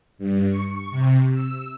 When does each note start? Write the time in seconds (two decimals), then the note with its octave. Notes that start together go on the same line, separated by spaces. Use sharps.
0.19 G2
0.50 C#6
0.91 C3
1.32 E6